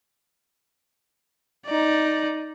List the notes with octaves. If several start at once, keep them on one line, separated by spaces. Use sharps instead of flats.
D#4 D5